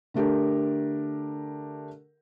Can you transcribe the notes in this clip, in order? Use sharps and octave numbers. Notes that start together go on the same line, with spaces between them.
D3 A3 D4 G4 A#4